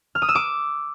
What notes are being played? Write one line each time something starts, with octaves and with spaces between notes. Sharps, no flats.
F6
D#6
E6
D6